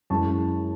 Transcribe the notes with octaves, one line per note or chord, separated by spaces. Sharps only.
F#2 E3 G#3 A5 C#6